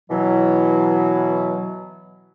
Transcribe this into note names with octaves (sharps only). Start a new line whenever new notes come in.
B2 E3 F#3